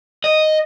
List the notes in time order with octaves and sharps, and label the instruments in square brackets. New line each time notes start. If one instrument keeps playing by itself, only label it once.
[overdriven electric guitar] D#5